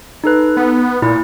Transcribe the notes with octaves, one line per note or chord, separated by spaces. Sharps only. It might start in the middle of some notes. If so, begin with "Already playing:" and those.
D#4 A4 B4
B3
A#2 E4